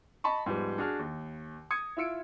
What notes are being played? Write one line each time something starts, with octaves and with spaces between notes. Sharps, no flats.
D#5 A5 B5 C#6
G#2 F3 G3 B3
D4 F#4 G#4 F6
D#2
D#6 G#6 C#7
E4 F4 E6 C#7 D7